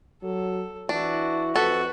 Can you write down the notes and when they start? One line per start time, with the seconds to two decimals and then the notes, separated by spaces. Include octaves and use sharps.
0.23 F#3 A4
0.89 E3 D4 E4 F#4
1.56 F2 F#4 A4 B4 B5